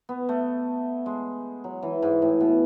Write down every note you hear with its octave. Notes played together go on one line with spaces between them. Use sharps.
B3
A3
G#3
F#3
E3
G#2
A2
B2